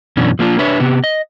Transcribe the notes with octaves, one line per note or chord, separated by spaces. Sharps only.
F#2 B2 E3 B3 C#4 D4
F3 A#3 D4 F4
D4 B4 C#5 E5
C3 B3 G4
D#5